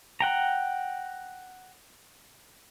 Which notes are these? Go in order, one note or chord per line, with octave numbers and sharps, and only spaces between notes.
F#5 G5 A#5